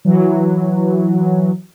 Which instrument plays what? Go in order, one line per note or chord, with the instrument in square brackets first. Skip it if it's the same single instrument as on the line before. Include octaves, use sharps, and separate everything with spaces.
[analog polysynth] E3 F#3